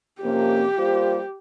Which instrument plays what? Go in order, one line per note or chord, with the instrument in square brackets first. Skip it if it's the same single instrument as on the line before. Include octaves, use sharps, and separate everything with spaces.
[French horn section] F2 C3 F3 A#3 C#4 [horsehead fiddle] G4
[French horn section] G3 A#3 F4 C5